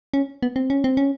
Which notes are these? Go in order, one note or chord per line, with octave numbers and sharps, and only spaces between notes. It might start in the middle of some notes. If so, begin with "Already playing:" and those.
C#4
B3
C4
C#4
C4
C#4